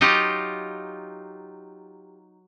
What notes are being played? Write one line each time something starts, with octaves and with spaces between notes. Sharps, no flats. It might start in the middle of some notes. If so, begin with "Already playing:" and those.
F#3 D#4 F4 G4